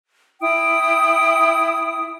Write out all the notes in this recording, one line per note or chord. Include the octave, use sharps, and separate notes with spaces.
E4 G5 D#6